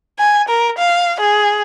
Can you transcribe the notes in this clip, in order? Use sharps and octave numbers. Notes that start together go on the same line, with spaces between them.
G#5
A#4
F5
G#4